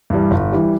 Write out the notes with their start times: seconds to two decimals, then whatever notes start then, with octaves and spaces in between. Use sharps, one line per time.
0.10 G2 E3 G3
0.31 G1
0.52 E3 G3